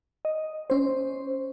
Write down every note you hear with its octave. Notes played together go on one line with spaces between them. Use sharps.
D#5
C#4 C5